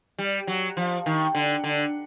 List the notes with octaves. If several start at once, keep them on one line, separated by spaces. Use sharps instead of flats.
G3
F#3
F3
D#3
D3
D3